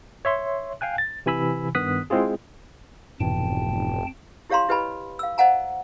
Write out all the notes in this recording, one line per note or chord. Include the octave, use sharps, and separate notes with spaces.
C#5 E5 C6
F5 G5 G#5 F#6
A6
C3 E3 G#5 B5 E6
G2 D#3 B3 D#6 F#6 B6
G#3 C4 E4 F4 G#4
F1 F2 G#2 B2 E3 G5 A5
E4 G4 C#5 F5 A#5 C6
E4 G4 B4 D#5 G#5 B5
F5 E6
C5 D#5 F5 F#5 G#5 A#5